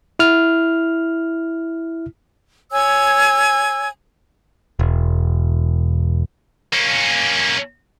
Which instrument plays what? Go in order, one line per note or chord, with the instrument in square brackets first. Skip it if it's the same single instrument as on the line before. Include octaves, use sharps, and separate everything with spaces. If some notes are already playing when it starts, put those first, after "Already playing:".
[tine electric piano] E4 F6
[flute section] C#5 G#5 E6
[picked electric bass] E1
[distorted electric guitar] A#3 C#4